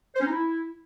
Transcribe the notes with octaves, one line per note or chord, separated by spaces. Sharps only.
C5
C#4
D#4
E4